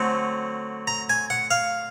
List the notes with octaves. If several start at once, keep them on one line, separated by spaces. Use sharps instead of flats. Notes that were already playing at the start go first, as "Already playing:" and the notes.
Already playing: D3 F#3 A3 C4
A#5
G#5
F#5
F5